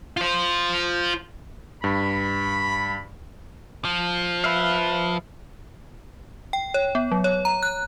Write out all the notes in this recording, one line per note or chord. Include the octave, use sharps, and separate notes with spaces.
F4 C5
G2 B5
F3
B4 E5 F5
G5
C#5
B3
F#3
C#5
A#5
F#6